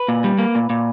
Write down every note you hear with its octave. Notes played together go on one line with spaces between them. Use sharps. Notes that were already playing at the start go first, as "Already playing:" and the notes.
Already playing: B4
A#2
G3
A#3
A#2
A#2